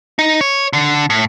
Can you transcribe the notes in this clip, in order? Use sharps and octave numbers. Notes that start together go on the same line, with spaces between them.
D#4
C#5
D3
A2